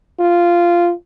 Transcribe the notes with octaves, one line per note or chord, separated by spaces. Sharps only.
F4